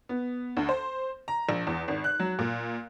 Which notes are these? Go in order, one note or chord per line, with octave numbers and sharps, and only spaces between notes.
B3
D2
C5
A#5
A#1
E2
G#1
F#6
F#3
A#2